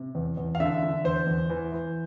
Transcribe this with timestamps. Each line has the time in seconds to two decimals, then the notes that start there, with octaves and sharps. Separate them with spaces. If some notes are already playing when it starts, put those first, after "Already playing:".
Already playing: C3
0.15 E2
0.37 E2
0.55 F5
0.60 D3 E5
0.83 D3
1.04 E2 C5
1.27 E2
1.50 E3
1.72 E3